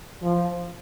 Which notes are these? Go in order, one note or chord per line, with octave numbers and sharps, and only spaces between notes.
F3